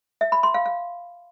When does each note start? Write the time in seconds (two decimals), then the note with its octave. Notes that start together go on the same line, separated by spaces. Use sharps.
0.21 E5
0.32 B5
0.43 C6
0.54 F5
0.66 F5